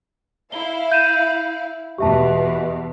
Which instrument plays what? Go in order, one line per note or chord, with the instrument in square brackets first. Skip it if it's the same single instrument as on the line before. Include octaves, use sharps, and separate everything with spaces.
[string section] E4 F5 [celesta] G7
[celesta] G6 D#7 E7
[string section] E2 B2 [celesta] G4 E5 A5